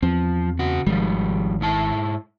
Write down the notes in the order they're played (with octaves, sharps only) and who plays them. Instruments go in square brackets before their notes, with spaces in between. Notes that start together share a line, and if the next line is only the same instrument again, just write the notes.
[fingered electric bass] E2 C4 [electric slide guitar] F3
[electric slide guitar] C#3 F#4
[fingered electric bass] G#1 D#3 G#3 [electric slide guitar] F3 G3
[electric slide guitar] G#2 E4 A5